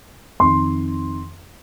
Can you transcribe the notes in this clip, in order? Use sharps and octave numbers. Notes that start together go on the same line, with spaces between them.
F2 D#3 C6